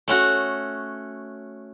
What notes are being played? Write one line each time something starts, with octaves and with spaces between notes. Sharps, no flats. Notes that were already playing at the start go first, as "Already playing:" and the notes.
A3 C#4 F#4